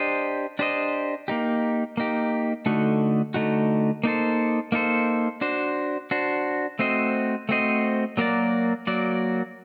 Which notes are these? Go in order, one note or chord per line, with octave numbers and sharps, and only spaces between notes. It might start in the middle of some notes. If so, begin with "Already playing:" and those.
Already playing: D4 G4 C5 D#5
D4 G4 C5 D#5
A#3 D#4 G4
A#3 D#4 G4
D3 A3 D#4 F#4
D3 A3 D#4 F#4
A#3 D#4 A4 C5
A#3 D#4 A4 C5
D4 F#4 C5
D4 F#4 C5
A3 C4 F#4 C5 D#5
A3 C4 F#4 C5 D#5
F#3 A#3 F#4 A#4 D5
F#3 A#3 F#4 A#4 D5